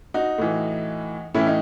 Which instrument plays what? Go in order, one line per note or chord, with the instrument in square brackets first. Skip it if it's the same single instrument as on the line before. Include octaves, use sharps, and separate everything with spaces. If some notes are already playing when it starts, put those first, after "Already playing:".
[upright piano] D#4 F#4
A2 E3
A2 E3 C#4 E4
D#4